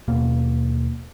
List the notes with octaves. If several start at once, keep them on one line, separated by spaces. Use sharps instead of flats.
D#2 B2 A#3